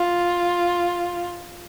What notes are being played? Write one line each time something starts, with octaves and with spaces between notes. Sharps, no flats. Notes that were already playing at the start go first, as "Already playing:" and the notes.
Already playing: F4